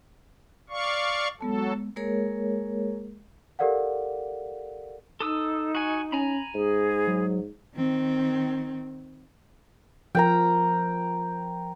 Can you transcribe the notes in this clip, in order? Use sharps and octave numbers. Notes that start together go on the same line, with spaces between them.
D5 F5 C#6
F#3 G#3 B3 A4 A5
G#3 A#3 G#4 A#4 C#5
G4 A4 A#4 D5 F5 F#5
D#4 A4 D#6 E6
F#4 G#5
C#4 G#5 A#5 B5
G#2 G#4
F#3
D#3 C4
F3 A#4 G5 A#5